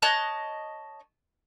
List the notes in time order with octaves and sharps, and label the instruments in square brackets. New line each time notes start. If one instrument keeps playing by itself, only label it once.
[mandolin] C#5 D#5 A5 F#6